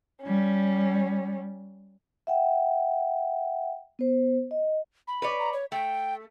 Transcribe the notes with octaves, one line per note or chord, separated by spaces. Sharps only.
G3 C#4
E5 F#5 G5
B3 C5
D#5
B5
B4 C#5 D5
A#5
C#5
A3 G5